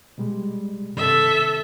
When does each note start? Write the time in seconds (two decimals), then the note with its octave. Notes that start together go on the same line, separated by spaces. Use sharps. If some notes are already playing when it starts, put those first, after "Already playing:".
0.18 B2 G3 G#3
0.97 G2 C3 D#3 A4 E5